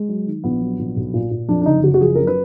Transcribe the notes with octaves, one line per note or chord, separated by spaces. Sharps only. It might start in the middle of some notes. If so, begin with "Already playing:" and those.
Already playing: G#3
F#3
D#3
A#1 B3
F#3
A#1
B1
A#2
A#2
F2 D4
D4
F#1 D#4
F#1 F#4
F#4
F3 G#4
F#2 A#4
B4